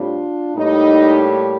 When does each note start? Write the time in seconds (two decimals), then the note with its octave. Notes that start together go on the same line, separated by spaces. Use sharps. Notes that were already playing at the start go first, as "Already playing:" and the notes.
Already playing: A2 G3 C4 D4 F4
0.56 A2 G3 A#3 D#4